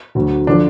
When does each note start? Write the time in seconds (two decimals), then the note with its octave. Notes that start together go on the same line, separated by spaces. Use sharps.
0.15 D2 D3 F#3
0.47 D3 F3 D4